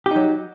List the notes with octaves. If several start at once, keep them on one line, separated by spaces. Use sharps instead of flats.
F#3 D#4 G4